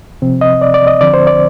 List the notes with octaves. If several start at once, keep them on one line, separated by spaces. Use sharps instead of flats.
C3 F3 C4
D#5
D5
D5
D#5
D3 F3 C4 D5
C5
D5